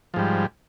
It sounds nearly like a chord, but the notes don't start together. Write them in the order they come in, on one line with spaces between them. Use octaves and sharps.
F3 G#2 G3